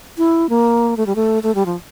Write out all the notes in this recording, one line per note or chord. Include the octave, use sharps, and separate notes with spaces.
E4
A#3
A3
G3
A3
A3
G3
F3